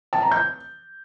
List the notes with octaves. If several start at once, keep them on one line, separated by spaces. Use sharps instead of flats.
A5
A#5
G6